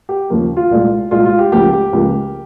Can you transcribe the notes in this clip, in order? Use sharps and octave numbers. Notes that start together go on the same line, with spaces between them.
G4
D#2 C#3 F3 A#3
F4
C2 A#2 G#3
C2 A#2 G#3 F4
F4
G4
C#2 C#3 F3 A#3 G4
G4
C#2 C#3 F3 A#3